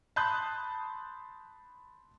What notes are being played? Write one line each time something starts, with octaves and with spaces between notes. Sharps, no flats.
A5 B5 C6 D#6 F#6 G6